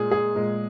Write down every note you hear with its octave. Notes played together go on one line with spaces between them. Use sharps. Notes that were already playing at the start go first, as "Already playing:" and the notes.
Already playing: A#2 G#3 G#4
G#4
A#2 G#3